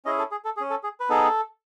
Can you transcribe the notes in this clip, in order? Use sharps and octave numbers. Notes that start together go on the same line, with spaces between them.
C#4 E4 G#4 D#5
A4
G#4
A4
G#4
C#4
A4
G#4
B4
B3 D#4 G#4 A4